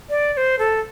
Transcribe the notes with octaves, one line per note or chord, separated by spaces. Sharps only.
D5
D5
C5
A4